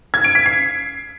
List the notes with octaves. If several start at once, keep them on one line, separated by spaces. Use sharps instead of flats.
G#6
D7
B6
C7